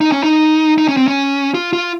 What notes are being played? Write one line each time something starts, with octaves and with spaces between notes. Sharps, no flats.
D#4
C#4
D#4
D#4
C#4
C4
C#4
F4
F4